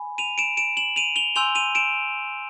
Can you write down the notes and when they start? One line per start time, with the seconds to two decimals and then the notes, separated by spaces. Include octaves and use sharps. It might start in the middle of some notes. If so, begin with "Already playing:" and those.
Already playing: G#5 B5
0.18 D#7 F7
0.38 D7 E7
0.57 D7 E7
0.77 E7 F#7
0.96 D#7 F7
1.16 F7 G7
1.36 G#5 C6 E6 G6 F7 G7
1.55 D#7 F7
1.75 D7 E7